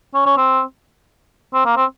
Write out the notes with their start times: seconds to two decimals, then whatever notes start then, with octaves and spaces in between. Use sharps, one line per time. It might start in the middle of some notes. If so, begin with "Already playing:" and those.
0.14 C#4
0.26 C#4
0.37 C4
1.54 C4
1.65 A#3
1.77 C4